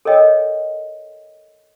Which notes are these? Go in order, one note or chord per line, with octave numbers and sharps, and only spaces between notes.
A4 A#4 C#5 D#5 G5